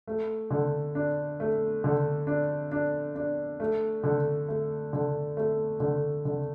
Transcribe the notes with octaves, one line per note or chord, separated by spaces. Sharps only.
A3
D3
D4
A3
D3
D4
D4
D4
A3
D3
A3
D3
A3
D3
D3